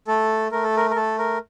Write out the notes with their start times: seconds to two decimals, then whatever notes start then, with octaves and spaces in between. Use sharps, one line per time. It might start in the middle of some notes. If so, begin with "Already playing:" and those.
0.07 A3 A4
0.52 A3 A#4
0.63 A4
0.76 A#4
0.90 A#4
0.96 A3 A4
1.18 A#4